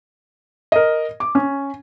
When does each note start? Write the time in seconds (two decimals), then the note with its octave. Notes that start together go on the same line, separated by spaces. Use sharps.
0.72 A#4 D#5
1.20 D6
1.35 C#4